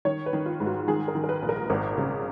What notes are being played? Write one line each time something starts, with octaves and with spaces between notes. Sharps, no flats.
D#3 C#5
B4
D#3
F4
G#2
F#4
D#3 G#4
A#4
D#3
A#4
B4
A#1
A#4
G#1 A#4
C#3